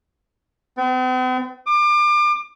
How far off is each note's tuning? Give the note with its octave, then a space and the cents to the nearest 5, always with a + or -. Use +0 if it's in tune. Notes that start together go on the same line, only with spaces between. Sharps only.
C4 -45
D6 +30